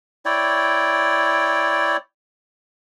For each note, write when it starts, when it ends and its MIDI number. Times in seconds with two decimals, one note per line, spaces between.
0.25 1.97 64
0.25 1.97 73
0.25 1.97 74
0.25 1.97 79